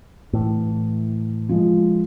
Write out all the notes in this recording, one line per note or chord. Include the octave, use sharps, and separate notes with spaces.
A2 E3
F3 G#3